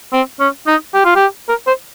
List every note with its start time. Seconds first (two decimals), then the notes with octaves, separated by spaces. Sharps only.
0.13 C4
0.40 C#4
0.67 D#4
0.94 G4
1.05 F4
1.16 G4
1.49 A#4
1.67 C5